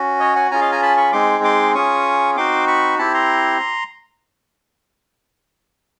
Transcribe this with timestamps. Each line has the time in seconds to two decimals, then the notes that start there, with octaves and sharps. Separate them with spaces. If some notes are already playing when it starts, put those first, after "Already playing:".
Already playing: C#4 F#4
0.20 C#5 D#5
0.36 F#5 G#5
0.51 C#4 F4 G#4 G#5 A#5
0.61 D#5 F5
0.72 G#5 A#5
0.82 A5 B5
0.97 B5 C#6
1.12 G#3 C4 D#4 G#4 C6 D6
1.44 C6 D6
1.75 C#4 F4 G#4 C#6 D#6
2.36 C4 D#4 F#4 C6 D6
2.67 B5 C#6
2.98 C4 E4 G4 A5 B5
3.14 A#5 C6